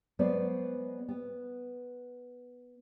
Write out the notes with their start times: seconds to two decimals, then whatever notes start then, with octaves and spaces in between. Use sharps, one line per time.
0.19 F#3 G#3 B3 B4 C5 D5
1.09 B3